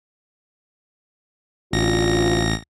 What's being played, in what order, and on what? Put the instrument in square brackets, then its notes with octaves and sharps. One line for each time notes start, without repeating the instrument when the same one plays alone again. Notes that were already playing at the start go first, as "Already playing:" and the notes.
[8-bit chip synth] A1 A#6 [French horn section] D2 F4